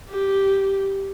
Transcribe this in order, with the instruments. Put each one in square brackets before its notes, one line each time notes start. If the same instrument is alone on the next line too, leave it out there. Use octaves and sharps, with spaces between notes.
[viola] G4